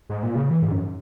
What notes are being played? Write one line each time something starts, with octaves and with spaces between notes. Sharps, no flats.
G#2
A#2
C#3
E3
G#2
F#2